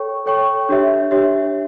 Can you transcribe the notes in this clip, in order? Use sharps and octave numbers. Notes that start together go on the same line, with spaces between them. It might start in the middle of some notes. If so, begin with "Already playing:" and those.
Already playing: A4 C#5 G5 C#6
A4 C#5 G5 C#6
D4 G4 C#5 E5
D4 G4 C#5 E5